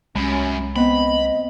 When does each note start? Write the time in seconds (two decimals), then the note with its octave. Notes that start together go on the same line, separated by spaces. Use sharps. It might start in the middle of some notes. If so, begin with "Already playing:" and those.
0.15 C2 F#2 G#3 C#4 B5
0.76 B3 C4 D#5 B5